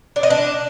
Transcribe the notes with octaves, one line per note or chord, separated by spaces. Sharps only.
D4
D#5
D4